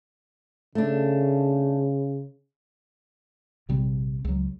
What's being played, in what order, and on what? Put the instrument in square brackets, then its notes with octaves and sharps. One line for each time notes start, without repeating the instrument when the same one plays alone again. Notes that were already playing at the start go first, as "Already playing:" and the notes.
[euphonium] C#3 [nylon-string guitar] A3 D4
[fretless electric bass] A#1 C3 G3 C4
C#2 F#3